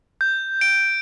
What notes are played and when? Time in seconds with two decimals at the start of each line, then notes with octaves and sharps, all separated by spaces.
0.21 G6
0.61 D7